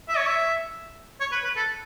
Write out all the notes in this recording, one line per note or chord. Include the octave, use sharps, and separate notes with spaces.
E5
C#5
E5
C#5
B4
B4
A4